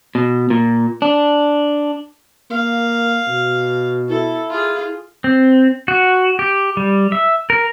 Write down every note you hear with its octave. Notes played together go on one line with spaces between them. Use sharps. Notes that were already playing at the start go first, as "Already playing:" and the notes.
B2
A#2
D4
A#3 F5
B2
E4 A4
F4 G#4
C4
F#4
G4
G3
E5
A#4